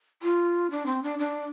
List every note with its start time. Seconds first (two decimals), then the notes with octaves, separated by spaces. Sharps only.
0.22 F4
0.70 D4
0.86 C4
1.03 D4
1.19 D4